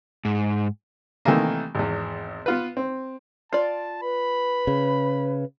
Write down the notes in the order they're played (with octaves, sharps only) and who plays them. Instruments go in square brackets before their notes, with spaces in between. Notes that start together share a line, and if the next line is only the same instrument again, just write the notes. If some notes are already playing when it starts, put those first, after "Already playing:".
[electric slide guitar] G#2
[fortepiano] C3 D#3 E3 G3 A3 A#3
G#1 E2
B3 F4 B4
C4
[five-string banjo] F4 D5 [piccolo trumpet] A5
[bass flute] B4 [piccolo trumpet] B5
[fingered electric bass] C#3